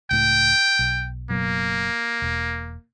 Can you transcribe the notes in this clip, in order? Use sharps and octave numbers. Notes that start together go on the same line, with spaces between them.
C#2 A2 G5
B1
F#1 B2 F#3 A#3
E1